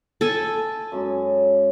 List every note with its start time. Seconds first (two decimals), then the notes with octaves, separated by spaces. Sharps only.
0.21 A4 G#5
0.92 F#2 G#3